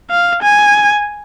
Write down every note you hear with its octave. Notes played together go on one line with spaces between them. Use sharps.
F5
G#5